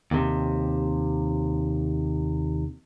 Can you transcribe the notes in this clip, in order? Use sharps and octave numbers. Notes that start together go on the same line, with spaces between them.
D#2 C3